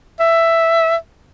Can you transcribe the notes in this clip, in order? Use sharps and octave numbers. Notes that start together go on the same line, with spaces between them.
E5